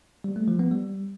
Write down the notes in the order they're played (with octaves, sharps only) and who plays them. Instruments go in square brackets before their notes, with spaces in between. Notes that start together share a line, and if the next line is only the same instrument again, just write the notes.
[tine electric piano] G3
A3
F3
B3
G3